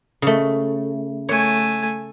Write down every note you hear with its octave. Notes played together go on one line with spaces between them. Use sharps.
C#3 A3
A3 C#5 G#5